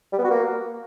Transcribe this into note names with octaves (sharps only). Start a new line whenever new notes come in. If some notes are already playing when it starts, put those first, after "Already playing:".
G3
B3
F#4
A#3